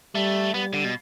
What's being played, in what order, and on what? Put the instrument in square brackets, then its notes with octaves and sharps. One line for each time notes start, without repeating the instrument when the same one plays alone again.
[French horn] G3 [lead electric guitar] A3
[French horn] G3 [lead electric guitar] B3
[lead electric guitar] D3
B2